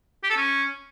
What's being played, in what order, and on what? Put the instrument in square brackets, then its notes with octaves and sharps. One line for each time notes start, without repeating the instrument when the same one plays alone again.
[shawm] G4
A4
C#4